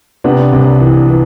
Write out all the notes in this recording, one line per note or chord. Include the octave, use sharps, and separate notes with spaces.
C3 B3 D4
C2
E3
E3